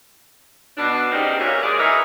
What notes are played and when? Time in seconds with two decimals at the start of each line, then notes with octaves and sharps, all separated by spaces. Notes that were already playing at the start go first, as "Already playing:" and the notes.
0.77 B2 D4
1.11 E2 D#3 G3 C4 C#4 D#4
1.39 A#2 A3 A#3 C#4 F#4
1.62 D#3 G#3 G#4 D5
1.78 E3 D#4 G#4 A#4 C#5 E5